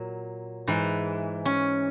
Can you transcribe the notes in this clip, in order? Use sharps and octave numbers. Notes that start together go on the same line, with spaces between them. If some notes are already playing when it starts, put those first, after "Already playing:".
Already playing: A#2 F#3
G#2 E3
C#4